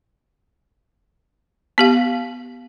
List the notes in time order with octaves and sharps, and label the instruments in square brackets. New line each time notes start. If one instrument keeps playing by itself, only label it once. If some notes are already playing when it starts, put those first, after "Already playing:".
[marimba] B3 G4 F5